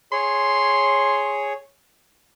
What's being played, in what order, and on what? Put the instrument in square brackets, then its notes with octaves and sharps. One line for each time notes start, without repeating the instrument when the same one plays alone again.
[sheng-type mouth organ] G#4 C#5 [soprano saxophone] C6